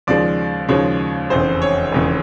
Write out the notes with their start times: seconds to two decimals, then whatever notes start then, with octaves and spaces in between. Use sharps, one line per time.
0.07 D#2 C#3 F3 G#3 D5
0.69 D#2 C#3 F3 G#3 C#5
1.30 F1 E2 C#3 C5
1.62 C#5
1.92 F1 E2 C#3